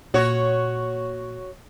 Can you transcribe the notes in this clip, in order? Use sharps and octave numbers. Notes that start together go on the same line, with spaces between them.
A#2 F#4 C#5